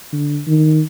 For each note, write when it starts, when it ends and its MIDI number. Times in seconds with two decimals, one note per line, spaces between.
0.13 0.41 50
0.47 0.81 51